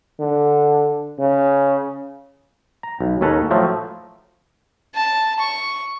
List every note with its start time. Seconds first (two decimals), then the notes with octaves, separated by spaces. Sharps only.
0.20 D3
1.19 C#3
2.83 A#5
3.01 B1
3.21 D#2 C#4 A4 B4 A5 A#5
3.51 A2 F3 F#3 A3
4.95 A5
5.40 C#6